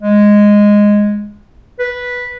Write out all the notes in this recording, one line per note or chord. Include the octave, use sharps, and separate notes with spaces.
G#3
B4